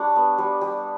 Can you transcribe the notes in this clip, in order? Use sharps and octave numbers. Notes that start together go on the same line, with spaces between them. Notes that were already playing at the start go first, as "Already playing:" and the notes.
Already playing: G3 D4 C#6
B3
G3
G3